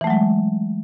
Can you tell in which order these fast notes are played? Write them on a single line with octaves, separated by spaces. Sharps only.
E3 A3 F#3 G#3